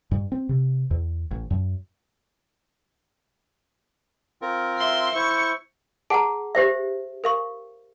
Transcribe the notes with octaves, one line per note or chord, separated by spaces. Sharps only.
G2
C4
C3
E2
A1
F#2
C4 F4 A#4
E5 C6
E4 C5 C#6 C#7
G#4 F#5 A5 A#5
G4 C5 E5
A#4 F5 C#6